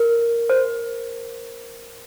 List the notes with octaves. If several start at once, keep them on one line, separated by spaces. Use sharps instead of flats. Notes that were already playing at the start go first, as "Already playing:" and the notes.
Already playing: A#4
C5